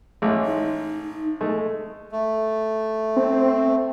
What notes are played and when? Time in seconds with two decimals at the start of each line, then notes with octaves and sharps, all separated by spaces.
0.22 A1 G#3
0.45 D#4
1.41 G#3 A3
2.12 A3
3.17 C4